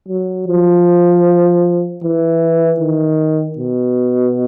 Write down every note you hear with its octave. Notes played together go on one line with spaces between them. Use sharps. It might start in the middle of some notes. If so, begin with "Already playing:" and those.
F#3
F3
E3
D#3
B2